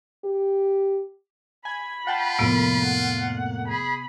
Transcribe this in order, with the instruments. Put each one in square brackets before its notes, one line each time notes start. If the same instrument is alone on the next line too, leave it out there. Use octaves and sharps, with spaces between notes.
[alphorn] G4
[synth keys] G#5 G#6 [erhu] B5
[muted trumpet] F4 [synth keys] F#5 G5 A5
[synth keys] F2 A2 A#3 [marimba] C3 B3
[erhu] F#5
[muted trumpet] G#4 [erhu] B5